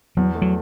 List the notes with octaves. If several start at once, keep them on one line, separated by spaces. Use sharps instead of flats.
E2 F#3
A3
F#3